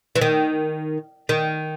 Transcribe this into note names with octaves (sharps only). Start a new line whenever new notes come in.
E3
D#3
D#3